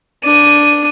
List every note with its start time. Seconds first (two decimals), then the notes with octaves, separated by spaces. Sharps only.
0.24 D4 D#7